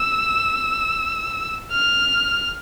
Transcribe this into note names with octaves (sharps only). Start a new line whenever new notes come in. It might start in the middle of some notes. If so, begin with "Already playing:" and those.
Already playing: E6
F6